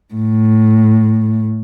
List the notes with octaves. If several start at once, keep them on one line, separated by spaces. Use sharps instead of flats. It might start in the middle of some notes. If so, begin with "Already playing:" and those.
A2